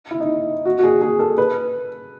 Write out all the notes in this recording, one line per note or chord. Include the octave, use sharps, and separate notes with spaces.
E4
D#4
F#4
F#4
G#4
G#4
A4
B4